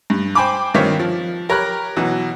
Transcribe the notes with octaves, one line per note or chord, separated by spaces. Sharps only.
G2
C5 G5 G#5 B5 D6
G2 D#3 C4 F4 C#5 B6
F3
G4 A#4 C#5 A#5 B5 F#6
B2 E3 F#3